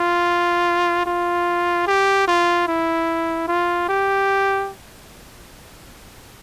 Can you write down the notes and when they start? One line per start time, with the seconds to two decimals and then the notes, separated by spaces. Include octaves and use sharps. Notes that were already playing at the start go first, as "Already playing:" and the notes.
Already playing: F4
1.06 F4
1.87 G4
2.28 F4
2.67 E4
3.48 F4
3.89 G4